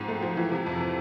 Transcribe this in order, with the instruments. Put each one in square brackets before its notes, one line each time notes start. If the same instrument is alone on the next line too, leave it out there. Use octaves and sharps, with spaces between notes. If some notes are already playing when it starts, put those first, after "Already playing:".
Already playing: [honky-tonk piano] G#2 F3 C4
A3
F3
E3
C3
F2